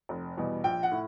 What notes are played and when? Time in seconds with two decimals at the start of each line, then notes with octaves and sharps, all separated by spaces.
0.09 F1
0.37 E2 B2 G3
0.64 A#1 G5
0.83 F#5
0.91 A2